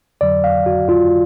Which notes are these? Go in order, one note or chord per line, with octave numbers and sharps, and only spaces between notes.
F2 D3 F#3 D5
F5
F#4
F4